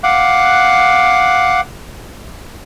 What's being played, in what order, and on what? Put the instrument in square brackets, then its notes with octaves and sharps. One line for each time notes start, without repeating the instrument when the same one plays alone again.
[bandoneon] F5 F#5 D6 F#6